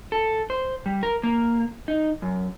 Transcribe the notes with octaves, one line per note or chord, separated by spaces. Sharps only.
A4
C5
G3
A#4
A#3
D#4
F#2